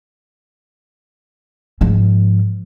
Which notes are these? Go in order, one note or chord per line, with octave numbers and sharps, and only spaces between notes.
G#2 F3